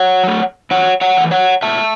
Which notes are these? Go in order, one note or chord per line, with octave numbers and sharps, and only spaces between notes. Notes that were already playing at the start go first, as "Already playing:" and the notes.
Already playing: C#5 F#5
F#3 A3
E2 C#5 F#5
C#5 F#5
E3 A3
C#5 F#5
B2 E5 A5